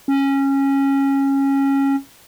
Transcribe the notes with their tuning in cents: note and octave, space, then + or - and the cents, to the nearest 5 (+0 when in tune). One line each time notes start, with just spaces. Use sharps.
C#4 -15